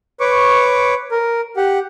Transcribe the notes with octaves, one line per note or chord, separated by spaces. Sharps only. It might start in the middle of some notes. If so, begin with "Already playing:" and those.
B4 C#5 C#6 D6
A#4
G4 F#5